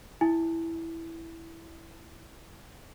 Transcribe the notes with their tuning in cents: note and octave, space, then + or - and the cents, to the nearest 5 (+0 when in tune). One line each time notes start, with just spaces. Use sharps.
E4 +0 G#5 +0